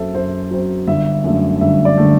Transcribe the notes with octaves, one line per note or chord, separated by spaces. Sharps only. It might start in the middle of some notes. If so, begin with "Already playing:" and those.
Already playing: F#2 F#3 C4 A4 E5
F#2 C5
F#3 C4
G1 E5
F#2 D3 A3
G1 E5
D5
D3 A3